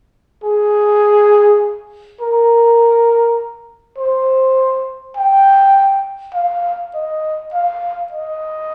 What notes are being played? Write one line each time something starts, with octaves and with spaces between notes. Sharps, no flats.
G#4
A#4
C5
G5
F5
D#5
F5
D#5